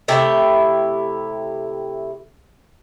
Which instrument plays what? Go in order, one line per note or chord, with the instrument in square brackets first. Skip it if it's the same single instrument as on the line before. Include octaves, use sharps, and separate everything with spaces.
[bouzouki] C3 A3 E4 G4